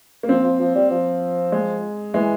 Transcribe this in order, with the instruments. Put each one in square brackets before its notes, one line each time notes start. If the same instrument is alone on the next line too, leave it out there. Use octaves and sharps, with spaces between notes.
[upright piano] A#3
[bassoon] F3 [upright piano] C4
[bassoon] F3
F3
G3
F3
[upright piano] G#3
[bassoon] E3 [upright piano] G#3